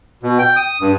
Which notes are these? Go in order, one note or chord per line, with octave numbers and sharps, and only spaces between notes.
B2
G5
D#6
G2